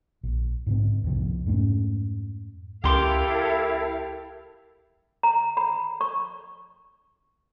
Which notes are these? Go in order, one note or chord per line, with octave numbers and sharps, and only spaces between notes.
A#1
G#2 C#3 C4
C2 F2 C3 F3
F2 G#2 A3 C#4
C#2 E4 G4 A4 A#4 F5 C6 D6
A#5
B5
C#6